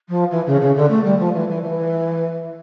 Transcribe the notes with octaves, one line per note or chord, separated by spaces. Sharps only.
F3
E3
C#3
C#3
D3
A3
G3
F3
E3
E3
E3